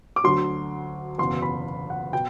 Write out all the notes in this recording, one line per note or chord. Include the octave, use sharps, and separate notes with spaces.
D6
D2 D3 F#3 C6
F#1 E2 B2 C6
B5
F#5
B2 G5